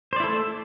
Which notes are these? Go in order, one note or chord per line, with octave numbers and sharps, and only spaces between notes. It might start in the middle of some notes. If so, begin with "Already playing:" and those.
A3 E4 A4 C5 D5